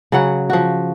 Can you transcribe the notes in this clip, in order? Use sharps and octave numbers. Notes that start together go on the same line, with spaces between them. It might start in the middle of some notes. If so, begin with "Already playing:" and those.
C#3 F#3 F#5
F3 F#4